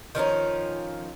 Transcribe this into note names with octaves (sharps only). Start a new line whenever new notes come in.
D#3 F3 C#4 D#4